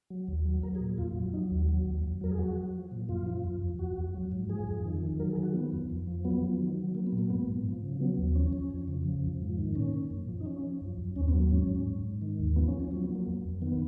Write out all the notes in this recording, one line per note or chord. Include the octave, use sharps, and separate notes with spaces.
F#3
D#2
F#3
F#3 A#4
G#4
A#2
F2 F4
F#3
F#3 D#4
D#2
F#3
D#2
F2
F#3 A#4
G#4
F#3 F#4
F#3
F3
A#2
F#2 F4
F3
F2
F2
F2 F#4
F2
F#3
G#2
F3 G#4
F2
D#3
D#3
F#3 A#4
G#4
D#3
F#4
F3 B3
F2
F2
F3
F#3 B3
F#3
D#3
F#3
F#3 A#3
B3
A#2
A#3
G#2 B3
G#2
F3
C#3
F#3 B3
D#2
F3 C#4
F3
F2
C#3
F3
F2
G#2
D#3
A#2 C#4
A#2
F#2
F3
D#4
F3 C#4
F3
F#2
F#2
D#2 C#4
B3
F#3
A#3
G#2 C#4
G#2
G#2
G#2
D#3
D#2
F3 B3
C#4
F3
C#4
F#3 C#4
B3
F#3
A#3
F2
F2
D#3 B3